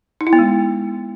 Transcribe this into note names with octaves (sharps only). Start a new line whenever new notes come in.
D#4
E4
B3
G#3